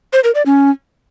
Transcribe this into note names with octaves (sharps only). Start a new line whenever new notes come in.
C5
A#4
D5
C#4